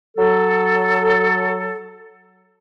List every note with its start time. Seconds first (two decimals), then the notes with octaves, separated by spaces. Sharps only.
0.17 F#3 A4